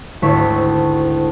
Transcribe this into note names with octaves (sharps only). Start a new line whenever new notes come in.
G#1 D2 E4 E5 C#6 B6